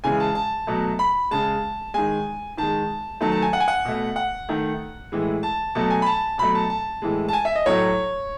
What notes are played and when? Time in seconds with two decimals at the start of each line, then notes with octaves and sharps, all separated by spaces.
0.04 C#3 E3 G#3 G#5
0.20 A5
0.35 A5
0.67 B2 F#3 A3
0.99 B5
1.31 C#3 G#3 A5
1.94 D#3 G#3 G#5
2.57 D#3 G#3 A5
3.21 D#3 F#3 A3 A5
3.32 A5
3.42 G#5
3.53 F#5
3.60 G#5
3.68 F#5
3.85 B2 A3
4.16 F#5
4.49 D#3 A3
5.12 A2 E3 G#3
5.43 A5
5.75 B2 F#3 A3 A5
5.90 G#5
6.02 B5
6.06 A5
6.38 B2 F#3 A3 B5
6.55 A5
6.70 A5
7.02 A2 E3 G#3
7.29 A5
7.33 G#5
7.45 E5
7.56 D#5
7.66 A2 F#3 A3 C#5